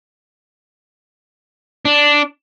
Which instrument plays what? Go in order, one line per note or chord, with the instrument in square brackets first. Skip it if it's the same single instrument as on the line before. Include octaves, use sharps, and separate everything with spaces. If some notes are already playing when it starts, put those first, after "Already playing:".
[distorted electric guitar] D4